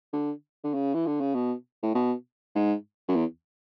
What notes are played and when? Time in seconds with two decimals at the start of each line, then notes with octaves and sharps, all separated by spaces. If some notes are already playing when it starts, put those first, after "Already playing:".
0.13 D3
0.64 D3
0.74 C#3
0.94 E3
1.07 D3
1.21 C#3
1.35 B2
1.83 A2
1.95 B2
2.55 G#2
3.08 F#2
3.16 E2